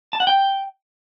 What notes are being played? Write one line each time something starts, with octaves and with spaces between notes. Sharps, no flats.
A5
F#5
G5